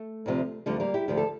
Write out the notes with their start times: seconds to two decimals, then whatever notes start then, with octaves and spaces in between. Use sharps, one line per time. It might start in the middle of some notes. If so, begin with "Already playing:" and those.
Already playing: A3
0.26 D2 C3 F3
0.66 D2 D3 F3 G3
0.80 G3 A#3
0.94 E4 G4
1.08 D2 D3 F3 G4
1.17 A4